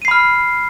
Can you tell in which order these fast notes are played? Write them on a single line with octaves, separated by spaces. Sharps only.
D#7 C7 B5 F6